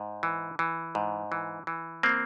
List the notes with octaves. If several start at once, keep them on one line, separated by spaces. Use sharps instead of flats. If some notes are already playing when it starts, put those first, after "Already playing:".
Already playing: G#2
E3
E3
G#2
E3
E3
A#3 C4